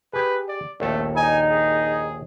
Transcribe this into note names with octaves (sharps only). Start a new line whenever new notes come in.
G4 G#4 B4
D5
A#1 D#2 A3 A4
D#4 G#5
G#4